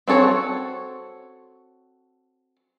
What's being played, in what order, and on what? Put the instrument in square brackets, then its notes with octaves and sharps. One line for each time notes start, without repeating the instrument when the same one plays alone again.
[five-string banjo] C4 F#4 A4 C#5